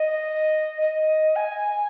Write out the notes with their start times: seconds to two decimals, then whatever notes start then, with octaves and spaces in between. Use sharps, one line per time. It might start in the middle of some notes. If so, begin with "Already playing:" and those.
Already playing: D#5
0.81 D#5
1.36 G#5